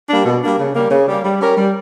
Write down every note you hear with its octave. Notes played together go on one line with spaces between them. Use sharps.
G3 A#3 D4
B2
G3 A#3 D4
C#3
G3 A#3
C#3
G3 A#3
G3
C#4 G4 A#4
G3